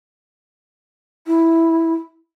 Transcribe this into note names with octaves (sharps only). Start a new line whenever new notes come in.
E4